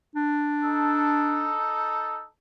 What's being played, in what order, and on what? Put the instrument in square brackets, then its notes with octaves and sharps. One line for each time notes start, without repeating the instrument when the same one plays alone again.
[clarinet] D4
[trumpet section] D#4 A4